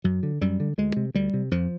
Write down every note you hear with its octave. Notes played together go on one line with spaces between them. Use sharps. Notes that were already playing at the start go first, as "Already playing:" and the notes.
F#2 F#3
D3
F#2 G3
D3
D2 G#3
C3
D2 G3
C3
F2 F3